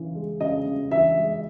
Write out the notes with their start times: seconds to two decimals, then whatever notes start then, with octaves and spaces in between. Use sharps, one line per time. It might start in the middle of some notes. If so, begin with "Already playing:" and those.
Already playing: C#3 E3
0.15 G#3
0.41 C#3 D#5
0.66 C#3
0.91 E3 E5
1.17 G#3